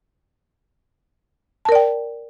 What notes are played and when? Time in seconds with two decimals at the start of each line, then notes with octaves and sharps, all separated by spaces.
1.65 A5
1.69 A#4
1.72 D5
1.75 G5